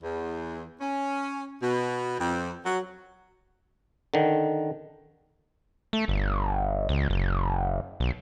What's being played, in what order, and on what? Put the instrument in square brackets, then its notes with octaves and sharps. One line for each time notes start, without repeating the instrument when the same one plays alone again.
[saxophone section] E2
C#4
B2
F2
F#3
[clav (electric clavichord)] D3 D#3
[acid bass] A3
G1
C#2
F#1
B1